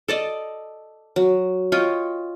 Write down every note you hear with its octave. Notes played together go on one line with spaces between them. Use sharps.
A4 D5 D#5
F#3
F4 C#5 D#5 G5